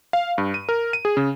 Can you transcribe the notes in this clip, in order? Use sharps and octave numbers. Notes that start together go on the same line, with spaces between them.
F5
G2
D#7
A#4
D#7
G#4
C#3